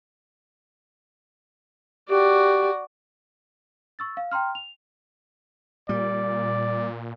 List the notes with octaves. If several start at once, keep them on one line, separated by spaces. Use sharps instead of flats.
F#4 G4 D5
C#6 E6 A6
F5
G5 A#5 C6 F6
F7
A#2 G3 D5